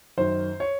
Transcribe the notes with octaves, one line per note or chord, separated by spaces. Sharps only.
F#2 D#3 C5
C#5